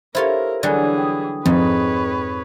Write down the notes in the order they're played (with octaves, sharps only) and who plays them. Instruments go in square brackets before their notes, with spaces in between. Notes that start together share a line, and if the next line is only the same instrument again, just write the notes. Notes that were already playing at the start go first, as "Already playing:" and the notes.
[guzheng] E4 F4 C#5 [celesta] G4 A4 C5 [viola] A#4
[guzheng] D3 F#3 G3 [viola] E3 G#4 [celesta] D5 G#5
[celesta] G5 D#6
[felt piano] F2 [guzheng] G#2 [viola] B4 C#5